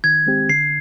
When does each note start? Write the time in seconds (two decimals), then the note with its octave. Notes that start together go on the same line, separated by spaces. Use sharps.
0.04 D#3 G#6
0.26 G#3 C4 G4
0.49 D3 C7